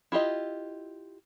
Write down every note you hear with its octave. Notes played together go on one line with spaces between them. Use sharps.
E4 F4 G4 D#5